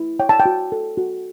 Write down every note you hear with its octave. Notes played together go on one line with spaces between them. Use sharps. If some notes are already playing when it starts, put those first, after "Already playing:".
Already playing: E4
C#5 G5
A5
G5
F#4
A4
F#4